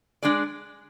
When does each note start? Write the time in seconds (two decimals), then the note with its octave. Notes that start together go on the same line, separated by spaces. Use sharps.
0.23 G#3 D4 G#4 D5